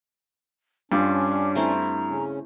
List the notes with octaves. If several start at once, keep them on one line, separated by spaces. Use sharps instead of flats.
G2 C#4 D4 F4 D6
A3 C4 E4 A#5
C#3 C#4